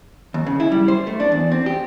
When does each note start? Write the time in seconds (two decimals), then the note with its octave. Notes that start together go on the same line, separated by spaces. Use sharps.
0.34 D#2
0.46 C#3
0.60 E4
0.72 G3
0.88 C5
1.07 A3
1.20 D4
1.32 E2
1.52 C4
1.66 G4